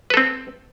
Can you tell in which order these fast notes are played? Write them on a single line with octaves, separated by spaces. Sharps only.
B4 A4 C4